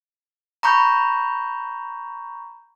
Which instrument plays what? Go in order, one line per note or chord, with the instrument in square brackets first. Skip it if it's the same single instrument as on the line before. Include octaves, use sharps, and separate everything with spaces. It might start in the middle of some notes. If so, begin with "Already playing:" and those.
[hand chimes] A#5 B5 C#6 G6